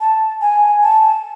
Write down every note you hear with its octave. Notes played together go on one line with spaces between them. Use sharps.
A5
G#5
A5